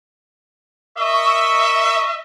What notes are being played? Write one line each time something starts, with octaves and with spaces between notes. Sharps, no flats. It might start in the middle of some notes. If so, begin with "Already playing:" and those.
A#4 D#5 E5 C#6